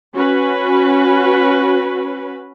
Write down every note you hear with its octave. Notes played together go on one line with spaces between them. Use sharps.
C#4 F#4 B4